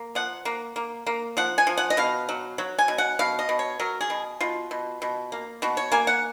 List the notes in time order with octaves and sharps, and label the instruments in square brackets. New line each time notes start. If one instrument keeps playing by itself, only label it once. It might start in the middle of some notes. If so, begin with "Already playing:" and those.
Already playing: [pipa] A#3
F3 F#5
A#3
A#3
A#3
F3 F#5
G#5
F3
F#5
D#5
B2 F5
F#3
F#3
G#5
B2
F#5
B2 F5
D#5
B2
C#5
F#3 A#4
G#4
B2
B2 F4
B2
B2
A#3
B2 F#4
C#5
A#3 G#5
F#5